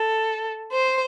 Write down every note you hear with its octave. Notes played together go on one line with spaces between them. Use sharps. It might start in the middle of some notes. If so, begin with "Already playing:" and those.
Already playing: A4
C5